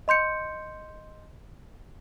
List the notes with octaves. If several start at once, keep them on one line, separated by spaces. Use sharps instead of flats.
D#5 C6 G6 C#7